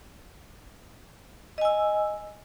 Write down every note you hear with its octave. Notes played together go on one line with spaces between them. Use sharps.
D#5 G#5 E6